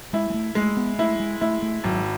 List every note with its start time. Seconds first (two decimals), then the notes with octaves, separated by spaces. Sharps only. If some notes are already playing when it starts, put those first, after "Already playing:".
0.13 G#3 E4
0.30 G#3
0.34 A3
0.55 G#3 A3
0.77 B3
0.99 A3 E4
1.20 G#3
1.41 A3 E4
1.62 A3
1.84 G#1 F#3